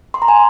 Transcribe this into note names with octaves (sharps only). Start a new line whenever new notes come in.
C6
A#5
G#5